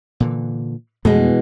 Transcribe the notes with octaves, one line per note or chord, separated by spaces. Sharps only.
A#2 D3 E3
F2 B2 E3 G#3 A3 B3